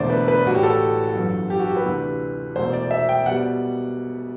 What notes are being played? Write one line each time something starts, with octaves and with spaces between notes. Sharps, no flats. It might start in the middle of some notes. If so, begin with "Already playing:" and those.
Already playing: E1 E2 D3 A3 C5 D5
B4
B4
A1 A2 G3 F#4
G4
A4
G1 F#2 E3
G4
F#4
G4
B4
D2 C3 E3 G3
E1 E2 B2 A3 C5
D5
E5
G5
B2 G3 F#5